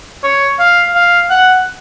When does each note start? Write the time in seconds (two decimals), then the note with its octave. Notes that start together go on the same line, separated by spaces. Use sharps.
0.24 C#5
0.59 F5
0.95 F5
1.30 F#5